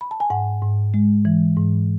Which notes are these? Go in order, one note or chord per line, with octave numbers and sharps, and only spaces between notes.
B5
A5
G#5
G#2 F#5
G#2
G#3
E3
G#2